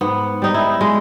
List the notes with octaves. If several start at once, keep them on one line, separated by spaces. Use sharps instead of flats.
G#2 B3
G3 D#4
E4
G#3